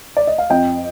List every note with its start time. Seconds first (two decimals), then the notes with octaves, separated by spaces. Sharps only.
0.17 D5
0.27 D#5
0.38 F5
0.50 F2 D#5 G5